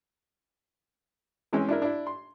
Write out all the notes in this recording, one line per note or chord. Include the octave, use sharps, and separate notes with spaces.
E3 G#3 C4 C#4
D4 E4 A#4
D4 E4
C6